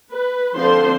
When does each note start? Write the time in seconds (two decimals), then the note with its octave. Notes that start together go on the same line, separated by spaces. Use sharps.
0.12 B4
0.56 D3 F3 C4 C5 C6